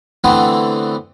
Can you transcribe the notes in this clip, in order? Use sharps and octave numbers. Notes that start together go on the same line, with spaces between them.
D3 E3 A3 B3 C4